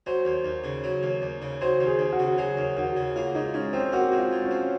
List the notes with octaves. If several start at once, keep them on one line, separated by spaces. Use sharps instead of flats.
F#3 C5
D#2
D#2
C#3
F#3
D#2
D#2
C#3
F#3 C5
D#2
G#4
D#2
F#4
C#3
F#3 G#4
D#2
D#2 F#4
C#3
A#3 F4
G#2 D#4
G#2 C#4
F3 C4
A#3 F#4
G#2
F4
G#2
C#4
F3